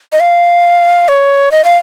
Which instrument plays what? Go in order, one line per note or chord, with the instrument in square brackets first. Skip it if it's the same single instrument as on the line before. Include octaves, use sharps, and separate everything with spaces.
[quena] D#5
F5
C#5
D#5
F5